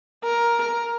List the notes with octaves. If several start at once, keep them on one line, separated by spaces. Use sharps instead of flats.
A#4